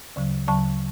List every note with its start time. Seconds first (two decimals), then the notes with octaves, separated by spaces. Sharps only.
0.16 D2 C#3 F#3
0.47 D2 C#3 F#3 A5 C#6